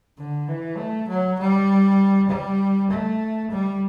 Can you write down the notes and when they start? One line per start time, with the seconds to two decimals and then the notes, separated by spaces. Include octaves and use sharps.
0.18 D3
0.48 E3
0.78 A3
1.09 F#3
1.39 G3
2.29 G3
2.91 A3
3.51 G3